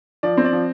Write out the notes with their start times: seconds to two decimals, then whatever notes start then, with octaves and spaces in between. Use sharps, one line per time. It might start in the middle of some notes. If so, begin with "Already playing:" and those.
0.23 F3 D5
0.37 C4
0.44 D5
0.52 F3